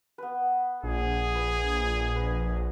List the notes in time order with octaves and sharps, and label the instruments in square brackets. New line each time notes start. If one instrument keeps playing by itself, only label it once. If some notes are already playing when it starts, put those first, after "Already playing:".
[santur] B3 B4
[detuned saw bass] A#1 [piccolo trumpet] G#4
[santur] B4 D#6
B4 D#5